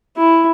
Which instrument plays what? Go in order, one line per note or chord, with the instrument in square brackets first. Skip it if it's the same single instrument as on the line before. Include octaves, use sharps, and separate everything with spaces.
[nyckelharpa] E4